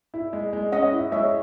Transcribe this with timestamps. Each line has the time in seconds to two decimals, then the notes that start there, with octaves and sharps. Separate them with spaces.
0.14 E4
0.33 G#3
0.53 G#3
0.72 C#4 D#5 F#5
0.92 E4
1.12 G#3 C#5 E5